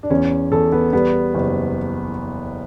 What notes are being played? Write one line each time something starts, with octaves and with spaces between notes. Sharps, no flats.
D4
E2 C#4
E2 A4
B3
G3 B3
F#1